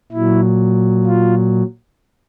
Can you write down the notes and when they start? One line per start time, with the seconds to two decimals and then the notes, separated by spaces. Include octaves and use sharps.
0.12 A#2 F#3 E4
1.07 F4